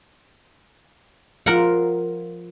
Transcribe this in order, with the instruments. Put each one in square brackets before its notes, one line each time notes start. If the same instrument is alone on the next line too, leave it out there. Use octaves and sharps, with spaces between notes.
[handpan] F3 F4 [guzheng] A#4 F#5